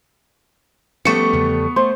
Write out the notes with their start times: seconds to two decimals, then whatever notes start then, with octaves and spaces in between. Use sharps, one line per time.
1.05 F3 G3 A3 B3 C#4 C#6 C#7
1.33 E2 C#3 F3
1.76 A3 C5